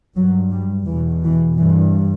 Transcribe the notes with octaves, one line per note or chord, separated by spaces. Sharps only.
G2 F#3
G3
E2 B2 E3
E3
G2 E3